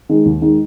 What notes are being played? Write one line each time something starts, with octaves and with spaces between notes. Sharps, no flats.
D#3 G#3
D#2
D#3 G#3